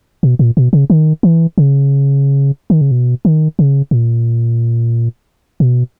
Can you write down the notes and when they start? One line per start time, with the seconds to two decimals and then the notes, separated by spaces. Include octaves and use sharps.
0.23 B2
0.39 A#2
0.57 B2
0.73 C#3
0.90 D#3
1.23 E3
1.58 C#3
2.70 D#3
2.81 C#3
2.91 B2
3.25 D#3
3.59 C#3
3.91 A#2
5.60 B2